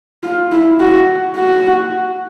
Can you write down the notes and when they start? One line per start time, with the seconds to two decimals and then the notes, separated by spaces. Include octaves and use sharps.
0.23 F4
0.52 E4
0.80 F#4
1.37 F#4